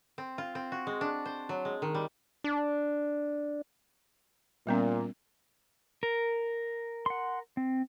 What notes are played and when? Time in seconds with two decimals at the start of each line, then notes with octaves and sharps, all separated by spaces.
0.18 C4
0.38 F4
0.55 C4
0.72 F#4
0.87 G#3
1.01 D4
1.25 C5
1.49 F#3
1.65 G#3
1.82 D#3
1.94 G3
2.44 D4
4.67 A#2 G3 B3 C#4
6.03 A#4
7.06 F#5 C6
7.57 C4